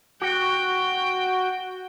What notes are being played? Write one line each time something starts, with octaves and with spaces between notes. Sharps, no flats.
F#4 G5